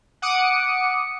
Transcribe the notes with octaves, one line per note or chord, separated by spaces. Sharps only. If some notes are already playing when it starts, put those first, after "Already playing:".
F#5 D6 D#6 C#7